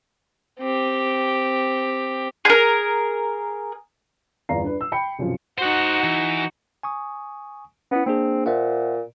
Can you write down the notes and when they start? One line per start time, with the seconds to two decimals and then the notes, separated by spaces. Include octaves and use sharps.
0.60 C4 G4
2.45 G#4 A#4
4.49 G1 E2 D5 F5 A#5 C7
4.63 D4 B4
4.81 E6
4.92 G5 B5 C#7
5.19 B1 F#2 C3 F3
5.58 D#4 F#4 C5 F#5
6.04 E3
6.83 G#5 C#6 D#6
7.91 B3 C#4 E4
8.06 A#3 C4 D4 G#4
8.46 A#2 C5 E5 F#5